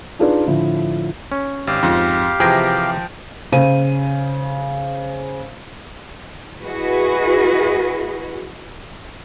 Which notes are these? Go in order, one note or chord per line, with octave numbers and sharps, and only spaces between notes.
D4 D#4 F4 G#4 B4 D5
A2 D3 F3 E4
C#4
G#1 G4 F5
F2 G#2
C3 E3 F3 G#4 G5 A#6
C#3 C5 D#7
E4 F#4 G#4 B4 D#5